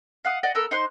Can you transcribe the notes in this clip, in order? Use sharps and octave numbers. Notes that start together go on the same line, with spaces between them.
F5 F#5 D#6
D5 D#5 F#5
B3 A4 A#4 E6
D#4 C5 C6 F#6